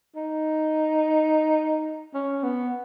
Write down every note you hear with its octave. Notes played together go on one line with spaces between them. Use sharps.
D#4
C#4
B3